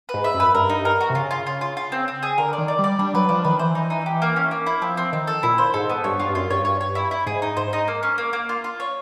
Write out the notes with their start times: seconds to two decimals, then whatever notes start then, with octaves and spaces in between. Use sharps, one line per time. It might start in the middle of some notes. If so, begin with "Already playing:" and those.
0.09 B4
0.14 G#2
0.24 E5
0.34 F#2
0.40 B4
0.55 G2 A#4
0.70 D#4
0.85 A#4
1.01 F#4
1.10 C3
1.15 C#3 F4
1.31 F4
1.47 F4
1.61 F4
1.77 F4
1.92 C4
2.08 C4
2.23 G#4
2.38 D3 A#4
2.53 D5
2.58 D#3
2.68 D5
2.79 G3
2.84 D5
2.99 G3 D4
3.14 F#3 B4
3.29 F3 D4
3.45 D#3 B4
3.59 E3 C5
3.75 D#4
3.90 D#4
4.06 G4
4.22 A#3
4.36 C#4
4.51 A#3
4.66 E4
4.82 F3 C4
4.97 C4
5.13 D#3 C4
5.27 A4
5.43 A#2 E4
5.58 C5
5.74 G#2 A4
5.90 B3
6.04 G2 C#5
6.19 G2 F4
6.30 G2
6.35 F#2 F4
6.50 G2 C#5
6.65 C#5
6.81 C#5
6.95 E4
7.11 E4
7.26 G#2 G#4
7.42 D#4
7.57 G#2 C5
7.73 D#4
7.88 A#3
8.03 C#4
8.18 A#3
8.33 A#3
8.49 F4
8.64 F4
8.80 C#5